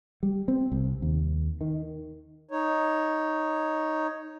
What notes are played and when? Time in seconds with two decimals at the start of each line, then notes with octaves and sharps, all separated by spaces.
0.23 G3
0.48 C4
0.72 C2
1.02 D#2
1.61 D#3
2.51 D#4 C#5